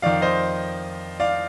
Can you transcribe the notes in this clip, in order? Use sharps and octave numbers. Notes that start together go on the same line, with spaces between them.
F2 D#3 D5 F5
C5 D#5
D5 F5